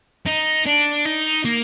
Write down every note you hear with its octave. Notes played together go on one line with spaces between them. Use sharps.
D#4
D4
D#4
A#3